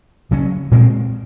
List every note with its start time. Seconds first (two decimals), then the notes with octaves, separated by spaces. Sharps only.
0.31 C#3 F#3 C#4
0.71 A#2 G#3 C4